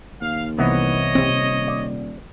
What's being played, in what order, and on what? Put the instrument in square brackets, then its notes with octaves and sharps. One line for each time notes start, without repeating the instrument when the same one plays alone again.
[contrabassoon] D#2 [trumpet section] F5
[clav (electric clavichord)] C2 E3 B3 [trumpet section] C#5 D#5
[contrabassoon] D#1 [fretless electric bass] C3 C4
[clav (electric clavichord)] D5